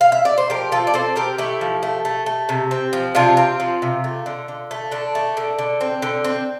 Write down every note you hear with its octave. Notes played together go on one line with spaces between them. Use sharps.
F5
E5
D5
C5
F3 G4 A#4
C4 F4 A4
D5
C4 A4 C5
C4 G4 A#4
A3 E4 G4
F3
A3
A3
A3
C3
C4
F3
C3 D4 F4
C4
F3
C3
A3
D3
D3
A3
D3 D4
A3
D3
D3
C4
D3
C4